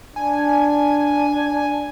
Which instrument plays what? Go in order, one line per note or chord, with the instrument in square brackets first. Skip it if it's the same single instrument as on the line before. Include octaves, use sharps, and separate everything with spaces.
[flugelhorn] D4 [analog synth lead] G#5